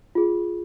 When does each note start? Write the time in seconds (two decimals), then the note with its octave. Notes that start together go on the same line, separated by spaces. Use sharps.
0.15 F4 G#4